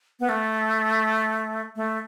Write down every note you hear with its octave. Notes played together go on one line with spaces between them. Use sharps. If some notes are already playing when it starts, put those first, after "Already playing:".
B3
A3
A3